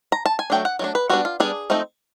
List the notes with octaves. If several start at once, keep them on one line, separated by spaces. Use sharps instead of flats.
A#5
A5
G#5
F#3 A3 D4 G5
F#5
F#3 A3 D4
B4
G3 B3 D4 F#4
F4
G3 B3 D4 G#4
F3 A3 C4 D#4